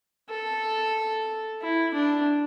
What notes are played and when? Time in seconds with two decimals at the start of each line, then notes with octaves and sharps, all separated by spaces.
0.30 A4
1.61 E4
1.94 D4